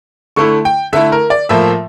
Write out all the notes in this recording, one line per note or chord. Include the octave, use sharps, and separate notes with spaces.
D3 A3 E4 C#6
G5
D3 A3 E4 E5
A#4
D5
A2 F3 A#3 E5